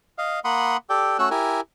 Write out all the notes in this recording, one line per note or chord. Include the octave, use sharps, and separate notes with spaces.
D#5 F5
A#3 F#5 B5 C6 D#6
G4 A4 D5 G5
A3 C#4 F#4 A4 E6 F#6
E4 G4 A#4 G#5